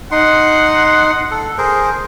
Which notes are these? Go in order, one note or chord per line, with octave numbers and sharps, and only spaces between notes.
D#4 F#5 C6
A4
G#4 A#4 C5